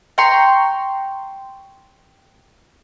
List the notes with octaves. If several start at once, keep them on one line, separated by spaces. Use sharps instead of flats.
G5 A#5 C6 C#6